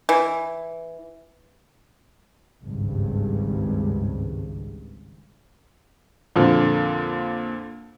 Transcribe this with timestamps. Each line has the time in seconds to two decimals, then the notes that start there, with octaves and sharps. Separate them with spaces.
0.09 E3
2.64 G#1 C#2 G2
6.36 F2 A#2 D3 F3